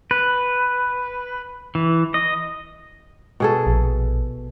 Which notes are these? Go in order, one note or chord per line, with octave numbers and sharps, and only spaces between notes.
B4
E3
D#5
B2 G#4 A4
A#1